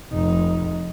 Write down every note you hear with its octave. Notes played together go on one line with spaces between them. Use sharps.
F1 D#4